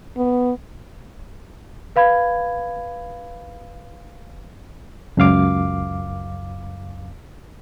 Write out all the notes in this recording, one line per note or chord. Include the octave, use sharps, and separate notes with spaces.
B3
B4 F5 B5 G#6
C#2 F#2 F5 D6